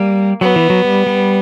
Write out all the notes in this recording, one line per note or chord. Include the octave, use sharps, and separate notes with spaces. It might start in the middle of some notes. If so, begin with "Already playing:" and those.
Already playing: G3 A#3
F#3 B3
E3
F#3
G3
G3